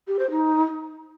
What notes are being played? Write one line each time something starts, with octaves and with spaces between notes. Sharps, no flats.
G4
C5
D#4